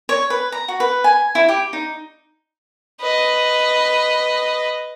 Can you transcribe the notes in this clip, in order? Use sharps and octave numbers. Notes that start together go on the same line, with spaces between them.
C#5
B4
A#5
F#4
B4
G#5
E4
G4
D#4
B4 D#5